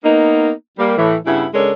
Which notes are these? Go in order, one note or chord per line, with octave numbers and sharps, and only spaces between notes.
A#3 B3 D#4
G3 A#3
A2 E3
G2 C#3 B3 E4
C#3 G#3 D4 A4 A#4 C#5